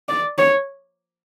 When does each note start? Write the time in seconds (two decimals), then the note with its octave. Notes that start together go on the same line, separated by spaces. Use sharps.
0.09 D5
0.38 C#5